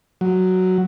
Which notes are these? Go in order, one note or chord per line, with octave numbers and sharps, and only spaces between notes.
F#3